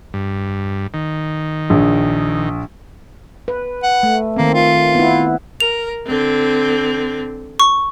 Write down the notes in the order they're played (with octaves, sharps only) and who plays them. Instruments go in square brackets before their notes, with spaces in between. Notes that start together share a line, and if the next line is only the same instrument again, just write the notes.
[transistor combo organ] G2
D#3
[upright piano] A#1
[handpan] B4
[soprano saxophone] F#5
[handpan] A3
[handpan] D#3 C4 [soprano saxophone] A#3
[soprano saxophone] F4
[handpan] B3 E4
[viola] A#4 [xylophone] F7
[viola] D3 C4
[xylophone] C#6